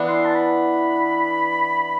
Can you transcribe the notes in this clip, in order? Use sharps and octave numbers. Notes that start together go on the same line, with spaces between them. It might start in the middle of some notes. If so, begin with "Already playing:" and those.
Already playing: E3 B3 D4
C6
A5
B5